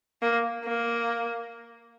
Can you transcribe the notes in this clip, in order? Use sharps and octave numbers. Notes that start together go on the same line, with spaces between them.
A#3
A#3